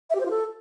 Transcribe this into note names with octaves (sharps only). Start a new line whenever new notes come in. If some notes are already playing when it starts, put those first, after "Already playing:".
E5
G4
C5
F4
A4